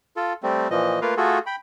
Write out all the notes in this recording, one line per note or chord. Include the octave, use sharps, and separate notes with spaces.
F4 A4
G3 A3 C4
A#2 E3 F3 D#5
A3 A#3 F4 A#4 B4 F5
A3 F4 F#4 G#4 A4
G5 B5